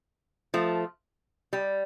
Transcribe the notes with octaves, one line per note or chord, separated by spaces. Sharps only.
F3 A3
G3